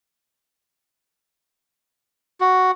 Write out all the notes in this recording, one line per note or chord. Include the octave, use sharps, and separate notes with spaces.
F#4